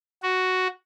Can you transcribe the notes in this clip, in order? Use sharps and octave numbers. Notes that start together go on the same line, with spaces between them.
F#4